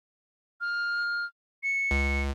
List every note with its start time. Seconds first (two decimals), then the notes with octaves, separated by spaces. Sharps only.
0.61 F6
1.63 C#7
1.91 C#2